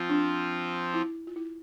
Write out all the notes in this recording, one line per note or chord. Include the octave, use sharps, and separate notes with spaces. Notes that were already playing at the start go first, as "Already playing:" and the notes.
Already playing: F3 C4 F4
D4
E4
F4
E4